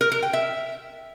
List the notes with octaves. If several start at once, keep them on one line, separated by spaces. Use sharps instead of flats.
A#4
A#4
G5
E5